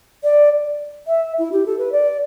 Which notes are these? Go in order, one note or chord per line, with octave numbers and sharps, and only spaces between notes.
D5
E5
E4
G4
A4
B4
D5